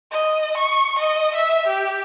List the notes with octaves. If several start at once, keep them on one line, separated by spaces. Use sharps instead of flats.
D#5
C#6
D#5
E5
G4